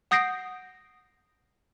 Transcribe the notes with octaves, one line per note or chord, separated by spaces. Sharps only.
F#5 D#6 G6 A#6 C7 D7